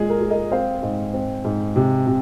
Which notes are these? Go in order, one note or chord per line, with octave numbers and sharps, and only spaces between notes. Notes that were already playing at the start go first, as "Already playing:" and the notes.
Already playing: A#2 G#3 G#4
A#4
G#3
A#4 D#5
C4 C5 F5
G#2
C4
G#2
C3
C3